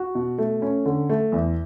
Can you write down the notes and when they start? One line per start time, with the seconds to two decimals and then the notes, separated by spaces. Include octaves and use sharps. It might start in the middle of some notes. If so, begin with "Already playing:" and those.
Already playing: F#4
0.15 B2
0.38 A3
0.62 C#4
0.85 D3
1.10 A3
1.32 E2